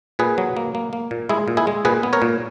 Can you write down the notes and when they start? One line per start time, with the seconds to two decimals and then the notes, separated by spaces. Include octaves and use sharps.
0.19 A#2 G#4 B4
0.38 F#3
0.57 A#3
0.75 A#3
0.93 A#3
1.11 A#2
1.29 G#3 E4 G#4
1.48 A#2
1.57 E4 G#4
1.67 G#3
1.85 A#2 G#4 B4
2.03 B3
2.13 A#4 C#5
2.22 A#2